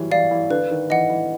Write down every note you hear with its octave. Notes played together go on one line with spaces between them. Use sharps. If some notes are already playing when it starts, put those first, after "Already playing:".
Already playing: E3 F#3 G3
E3 D5 F5
E3
D3 B4
D#3
E3 D#5 F#5
E3